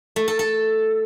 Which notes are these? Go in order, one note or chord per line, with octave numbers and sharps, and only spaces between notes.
A3
A4
A4